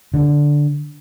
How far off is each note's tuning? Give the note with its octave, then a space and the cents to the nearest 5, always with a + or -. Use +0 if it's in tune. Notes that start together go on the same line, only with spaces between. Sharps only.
D3 -5